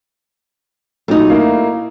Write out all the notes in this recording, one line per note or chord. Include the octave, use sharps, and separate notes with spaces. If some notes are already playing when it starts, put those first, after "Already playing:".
A#2 F#3 A3 D#4
A#3 E4